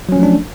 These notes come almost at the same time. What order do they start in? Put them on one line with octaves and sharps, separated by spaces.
F#3 C#4 F3 A3 D4